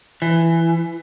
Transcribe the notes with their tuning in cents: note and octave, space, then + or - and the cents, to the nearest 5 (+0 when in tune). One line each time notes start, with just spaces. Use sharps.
E3 +10